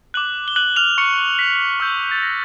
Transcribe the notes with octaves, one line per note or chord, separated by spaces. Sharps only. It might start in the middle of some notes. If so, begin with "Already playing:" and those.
D6 F#6 F#7
G7
F#6 F#7
F6 F7
C#6 C#7
B6
C#6 E6 G6
A6
A#6